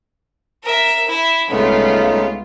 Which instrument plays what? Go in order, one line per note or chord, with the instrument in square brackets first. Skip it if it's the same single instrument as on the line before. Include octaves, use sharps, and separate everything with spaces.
[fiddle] A#4 E5
E4
[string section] C2 G#3 F4 [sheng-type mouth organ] A3 C#4 D#4 [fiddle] B3